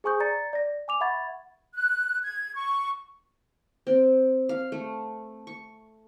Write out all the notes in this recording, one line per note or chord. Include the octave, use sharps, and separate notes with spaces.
G#4 C5 G#5 C#6 D#6 G6
D5 A#5 G#6 A6 C#7
D5 A#6
G#5 D6 F7
E5 F#5 B5 C#6 G#6 A6
F#6
G#6
C#6
C4
F5
A3
C#6